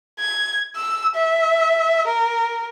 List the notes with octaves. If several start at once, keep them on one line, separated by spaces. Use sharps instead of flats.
G#6
E6
E5
A#4